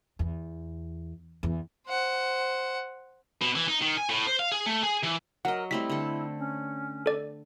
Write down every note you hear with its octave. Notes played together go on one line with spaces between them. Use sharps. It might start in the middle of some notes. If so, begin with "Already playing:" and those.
E2
E2
C5 F#5
B2
E3
D#4
D#3
G#5
A2
C5
F5
G#4
A3
G#4
E3
F#3 A#4 D#5 F#5
G3 A3 C4 E4 B6
D3 A4
C#4
A4 D5